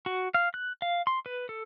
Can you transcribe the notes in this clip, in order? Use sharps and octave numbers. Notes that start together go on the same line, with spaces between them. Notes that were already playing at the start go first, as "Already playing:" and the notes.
F#4
F5
F#6
F5
C6
B4
A4